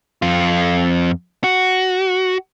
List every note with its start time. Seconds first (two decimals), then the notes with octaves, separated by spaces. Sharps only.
0.22 F2 F4
1.44 F#4